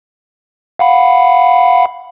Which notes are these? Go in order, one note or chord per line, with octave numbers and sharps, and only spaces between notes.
F5 F#5 B5